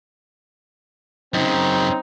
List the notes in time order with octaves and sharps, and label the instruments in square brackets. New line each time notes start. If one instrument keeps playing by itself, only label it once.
[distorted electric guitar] F#2 C#3 [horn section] C4 D#4